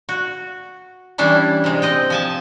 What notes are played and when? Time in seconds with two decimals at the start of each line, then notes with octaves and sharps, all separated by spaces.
0.09 F#4
1.18 E3 G3 C#4 D4 E4
1.64 C3 G#3
1.82 C4 D#5 G5
2.10 F3 G#5 A5